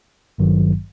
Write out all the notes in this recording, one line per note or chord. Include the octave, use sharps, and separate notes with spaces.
G#1 G2 D#3 F#3